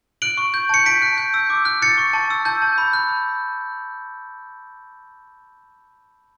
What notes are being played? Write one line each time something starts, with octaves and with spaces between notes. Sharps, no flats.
F#6 D7 F#7
C#6
G6
A5 C#7
A5 B6 D7
F#6
G6
E6
D6
F#6
F#6 A6 C#7
C#6
A5
E6
A5 G6
A5
B5
F#6